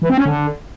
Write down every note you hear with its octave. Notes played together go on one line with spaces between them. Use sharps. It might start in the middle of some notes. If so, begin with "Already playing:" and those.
E3
C4
C#4
D3